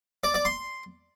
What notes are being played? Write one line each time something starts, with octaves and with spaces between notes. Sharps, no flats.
D5
D5
C6